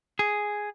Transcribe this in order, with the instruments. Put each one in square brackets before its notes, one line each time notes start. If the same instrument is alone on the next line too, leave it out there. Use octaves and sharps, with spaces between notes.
[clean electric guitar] G#4